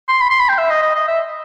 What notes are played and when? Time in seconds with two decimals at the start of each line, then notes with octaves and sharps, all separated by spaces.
0.08 C6
0.21 B5
0.30 C6
0.39 B5
0.49 G5
0.58 E5
0.70 D#5
0.82 D#5
0.95 D#5
1.07 E5